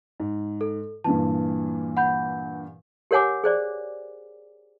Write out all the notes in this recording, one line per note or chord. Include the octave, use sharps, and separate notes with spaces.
G#2
A4
G2 A#2 E3 A5
F#5 B5 G6
G4 A#4 C#5 F#5 G#5 D6
G#4 C5 D5